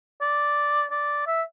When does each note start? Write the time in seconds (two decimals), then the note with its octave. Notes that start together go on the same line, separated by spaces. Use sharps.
0.21 D5
0.91 D5
1.27 E5